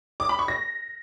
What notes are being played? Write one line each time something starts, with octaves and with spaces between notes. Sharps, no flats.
D6
B5
C#6
A#6